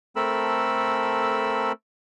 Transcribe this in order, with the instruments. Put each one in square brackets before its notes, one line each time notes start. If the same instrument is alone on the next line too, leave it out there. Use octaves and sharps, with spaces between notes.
[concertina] A3 C4 A4 A#4 B5 E6